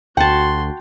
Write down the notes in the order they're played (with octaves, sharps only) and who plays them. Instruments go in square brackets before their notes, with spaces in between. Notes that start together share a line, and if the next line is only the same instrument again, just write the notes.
[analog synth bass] D2 [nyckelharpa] F#4 C6 [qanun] F#5 A5 [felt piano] G5